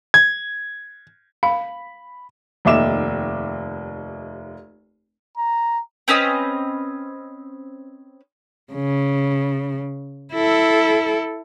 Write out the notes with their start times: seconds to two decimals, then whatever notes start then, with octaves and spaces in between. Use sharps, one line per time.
0.14 G#6
1.43 F5 B5
2.65 F1 D#2 D#5 E5 D6 E7
5.37 A#5
6.08 C4 C#4 B4 D#5
8.73 C#3
10.34 E4 A4